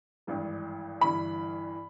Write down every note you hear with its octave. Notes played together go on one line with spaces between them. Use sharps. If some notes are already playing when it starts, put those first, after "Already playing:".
G#1 G2 E3
G1 G2 E3 B5